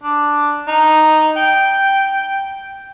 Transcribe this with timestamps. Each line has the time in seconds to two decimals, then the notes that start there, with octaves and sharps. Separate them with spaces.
0.03 D4
0.68 D#4
1.36 G5